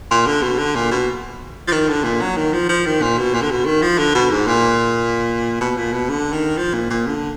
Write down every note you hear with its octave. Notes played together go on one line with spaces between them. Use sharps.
A#2
D3
B2
D3
A#2
B2
F3
D#3
D3
A#2
F#3
D#3
F3
F3
D#3
A#2
B2
A#2
D3
B2
D#3
F3
D3
B2
G#2
A#2
B2
A#2
B2
D3
D#3
F3
A#2
A#2
D3